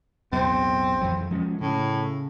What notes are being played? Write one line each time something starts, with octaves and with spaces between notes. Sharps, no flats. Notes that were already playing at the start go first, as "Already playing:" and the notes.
B1 E2 A2 C4
F2 E3 F#3
F3 G#3 C#4
A2 C#3